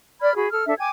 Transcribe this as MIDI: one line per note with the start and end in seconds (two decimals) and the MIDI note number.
0.21 0.34 74
0.21 0.34 83
0.21 0.34 89
0.21 0.34 92
0.36 0.48 66
0.36 0.48 68
0.36 0.48 83
0.52 0.64 69
0.52 0.64 89
0.66 0.74 62
0.66 0.74 69
0.66 0.74 76
0.79 0.90 79
0.79 0.90 80
0.79 0.90 86
0.79 0.90 92